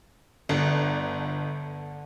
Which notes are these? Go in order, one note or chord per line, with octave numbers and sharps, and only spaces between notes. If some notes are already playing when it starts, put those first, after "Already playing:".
G1 D3